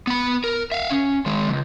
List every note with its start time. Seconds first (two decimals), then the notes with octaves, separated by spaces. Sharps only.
0.07 B3 B5
0.44 A#4
0.72 E5 F5
0.91 C#4
1.26 D#3 G#3
1.50 C#2 D#3